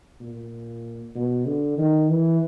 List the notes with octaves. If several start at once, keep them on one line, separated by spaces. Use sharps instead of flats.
A#2
B2
D3
D#3
E3